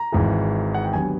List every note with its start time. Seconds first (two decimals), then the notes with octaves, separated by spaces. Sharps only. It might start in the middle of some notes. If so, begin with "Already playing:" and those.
Already playing: A#5
0.12 G#1 G#2 E3
0.74 F#5
0.84 G5
0.93 D#2 D3 F#3 B3 G#5